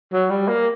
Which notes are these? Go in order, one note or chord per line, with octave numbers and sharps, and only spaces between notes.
F#3
G3
A#3